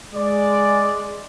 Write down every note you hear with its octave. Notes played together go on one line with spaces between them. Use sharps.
G#3 D5